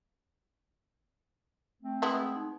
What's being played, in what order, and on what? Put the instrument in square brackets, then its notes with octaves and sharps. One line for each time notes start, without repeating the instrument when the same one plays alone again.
[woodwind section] A3 C4
[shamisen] G#3 B3 E4 [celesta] A5 C6 D#6
[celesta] D#4